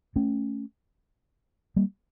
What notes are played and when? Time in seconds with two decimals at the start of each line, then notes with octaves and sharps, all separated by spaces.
0.16 A3 C#4
1.76 G3 A#3